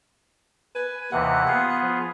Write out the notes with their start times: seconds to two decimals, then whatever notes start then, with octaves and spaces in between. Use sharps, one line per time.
0.75 B4 G#5
1.12 D#2 C3 E3 F#5
1.48 B3 F4 G#4
1.82 F3